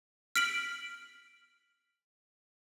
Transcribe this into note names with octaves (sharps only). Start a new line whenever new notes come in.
F6 B6 D7 F#7